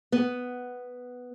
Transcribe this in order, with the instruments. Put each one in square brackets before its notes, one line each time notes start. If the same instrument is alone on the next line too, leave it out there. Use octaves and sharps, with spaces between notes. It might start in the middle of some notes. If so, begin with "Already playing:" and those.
[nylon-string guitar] B3